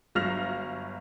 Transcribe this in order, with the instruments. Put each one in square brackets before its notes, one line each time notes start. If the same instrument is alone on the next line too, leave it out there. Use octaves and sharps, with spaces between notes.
[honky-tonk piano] G1 F#3 F5 F6 A#6 F7